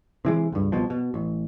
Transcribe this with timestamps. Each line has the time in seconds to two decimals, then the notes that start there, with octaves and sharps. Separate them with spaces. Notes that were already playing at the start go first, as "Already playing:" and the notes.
0.25 C3 E3 G#3
0.52 C#2 G2
0.72 C2 B2 F3
0.90 B2
1.14 A1